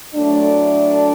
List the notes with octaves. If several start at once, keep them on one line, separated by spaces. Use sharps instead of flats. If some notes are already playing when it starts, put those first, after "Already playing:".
A2 F#3 A3 D4